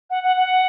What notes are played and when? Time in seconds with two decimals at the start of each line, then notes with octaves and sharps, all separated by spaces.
0.10 F#5
0.23 F#5
0.36 F#5